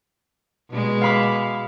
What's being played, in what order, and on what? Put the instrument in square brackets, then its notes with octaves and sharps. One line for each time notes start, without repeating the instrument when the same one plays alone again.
[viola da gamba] B2 G#3
[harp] F5 B5 D6